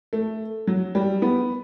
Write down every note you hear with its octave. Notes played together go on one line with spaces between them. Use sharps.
A3
F#3
G3
B3